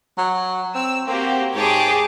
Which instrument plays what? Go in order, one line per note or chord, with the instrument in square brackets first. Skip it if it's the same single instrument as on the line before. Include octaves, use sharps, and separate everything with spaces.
[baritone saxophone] F#3
[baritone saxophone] C4 [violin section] E6
[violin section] A#3 F#4 G4 [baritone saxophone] C4
[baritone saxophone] G#2 [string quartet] G4 G#4 [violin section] C#5 A5 D6